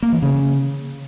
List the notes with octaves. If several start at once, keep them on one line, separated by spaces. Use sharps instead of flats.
A#3
E3
C#3